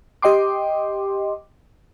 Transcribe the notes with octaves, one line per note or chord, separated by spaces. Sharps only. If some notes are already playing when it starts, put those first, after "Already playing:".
G4 D#5 G5 C6 D6